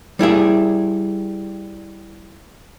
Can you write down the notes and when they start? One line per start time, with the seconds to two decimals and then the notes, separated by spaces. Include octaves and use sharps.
0.19 G3 E4 G#4 E5